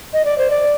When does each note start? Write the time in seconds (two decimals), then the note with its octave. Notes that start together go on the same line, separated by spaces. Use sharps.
0.13 D#5
0.25 D5
0.38 C5
0.50 D5